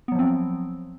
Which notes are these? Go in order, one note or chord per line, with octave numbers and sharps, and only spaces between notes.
F3 F#3 B3 C4